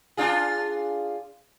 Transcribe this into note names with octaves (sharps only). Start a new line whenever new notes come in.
D4 F4 G#4